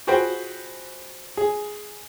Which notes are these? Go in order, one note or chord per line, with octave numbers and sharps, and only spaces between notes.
F4 F#4 G#4 B4 C5 G5
G#4